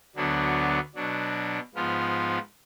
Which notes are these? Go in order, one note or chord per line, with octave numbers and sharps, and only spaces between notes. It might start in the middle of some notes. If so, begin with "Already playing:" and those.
D2 D3 F#3 B3 D4
B2 F#3 D4
G#2 F3 B3 F4